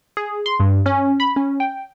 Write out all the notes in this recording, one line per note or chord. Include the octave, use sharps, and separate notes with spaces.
G#4
C6
G2
C#4
B5
C#4
G5